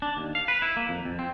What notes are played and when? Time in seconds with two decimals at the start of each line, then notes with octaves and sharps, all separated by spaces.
0.02 D4
0.17 D#2
0.35 F5
0.48 B4
0.62 E4
0.77 A#3
0.89 F2
1.05 F2
1.19 C4